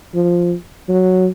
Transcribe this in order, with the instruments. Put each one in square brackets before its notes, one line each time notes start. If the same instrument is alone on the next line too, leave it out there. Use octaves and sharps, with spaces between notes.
[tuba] F3
F#3